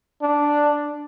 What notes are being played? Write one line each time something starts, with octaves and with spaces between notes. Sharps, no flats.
D4